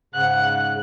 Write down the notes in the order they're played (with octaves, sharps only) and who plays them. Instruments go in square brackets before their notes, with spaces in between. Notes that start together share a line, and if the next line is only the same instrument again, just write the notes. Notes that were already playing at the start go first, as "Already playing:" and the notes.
[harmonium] G#2 C#3 [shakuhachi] F#5 [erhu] F#6